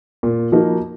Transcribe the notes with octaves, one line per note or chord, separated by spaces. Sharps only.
A#2
F3 A#3 D#4 F#4